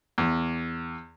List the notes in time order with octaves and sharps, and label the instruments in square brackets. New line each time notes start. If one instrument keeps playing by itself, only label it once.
[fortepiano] E2